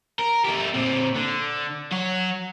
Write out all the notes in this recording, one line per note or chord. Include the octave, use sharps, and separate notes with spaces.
A#4
A3 G4
A#2 C4
D3
F#3 F#4